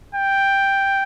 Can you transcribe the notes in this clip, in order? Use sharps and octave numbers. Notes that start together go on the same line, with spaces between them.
G5